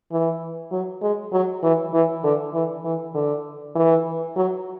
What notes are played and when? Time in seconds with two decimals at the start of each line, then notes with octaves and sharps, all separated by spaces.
0.11 E3
0.72 F#3
1.02 G#3
1.32 F#3
1.63 E3
1.93 E3
2.24 D3
2.53 E3
2.84 E3
3.14 D3
3.75 E3
4.36 F#3